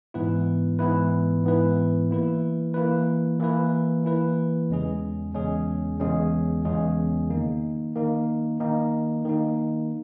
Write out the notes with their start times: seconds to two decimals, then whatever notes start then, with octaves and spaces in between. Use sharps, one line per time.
0.14 G#2 E3 B3 E4 B4
0.79 G#2 E3 B3 E4 B4
1.44 G#2 E3 B3 E4 B4
2.10 E3 A#3 E4 B4
2.74 E3 A#3 E4 B4
3.40 E3 A#3 E4 B4
4.05 E3 A#3 E4 B4
4.70 E2 C#3 G#3 C#4 G#4
5.34 E2 C#3 G#3 C#4 G#4
6.00 E2 C#3 G#3 C#4 G#4
6.65 E2 C#3 G#3 C#4 G#4
7.30 D#3 A#3 D#4
7.96 D#3 A#3 D#4
8.60 D#3 A#3 D#4
9.25 D#3 A#3 D#4